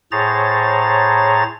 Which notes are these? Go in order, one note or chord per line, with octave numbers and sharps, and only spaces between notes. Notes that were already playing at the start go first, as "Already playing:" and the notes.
A2 G#4 C5 C#5 A#5 A6